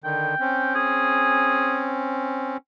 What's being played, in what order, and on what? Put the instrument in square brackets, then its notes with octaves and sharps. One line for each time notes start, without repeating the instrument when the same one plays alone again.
[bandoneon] D3 D#3 [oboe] G5
[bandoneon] C4 C#4
[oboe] G#4